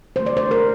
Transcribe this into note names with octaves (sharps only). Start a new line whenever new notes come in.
D3 A3 C5
D5
C5
A#4